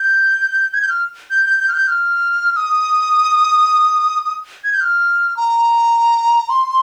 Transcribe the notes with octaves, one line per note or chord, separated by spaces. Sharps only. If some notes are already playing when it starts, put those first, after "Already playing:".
Already playing: G6
G#6
G6
F6
G6
G6
G6
F6
G6
F6
D#6
G#6
G6
F6
A#5
C6